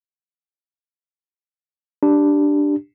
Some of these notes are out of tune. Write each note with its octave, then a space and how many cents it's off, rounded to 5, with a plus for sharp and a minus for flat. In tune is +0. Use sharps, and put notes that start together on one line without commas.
D4 +0 G4 +0